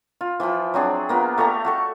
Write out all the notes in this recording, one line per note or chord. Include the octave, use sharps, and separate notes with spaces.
F4
E3 F3 E5 G5
F#3 C4 D4 G#4
A#3 B3 F4
A3 G4 D5 A#5
F#4 A4 C#6